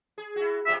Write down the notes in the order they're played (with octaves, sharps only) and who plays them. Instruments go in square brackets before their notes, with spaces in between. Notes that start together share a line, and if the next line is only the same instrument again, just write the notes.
[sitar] G#4
E4 F#4
[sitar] B2 F4 G#4 [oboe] E5